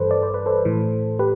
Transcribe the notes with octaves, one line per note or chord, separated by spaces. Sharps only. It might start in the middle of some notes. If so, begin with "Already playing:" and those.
Already playing: G2 E3 A4 B4 C5
D5
C5
B4
A4 C5
A2 E3
G4 B4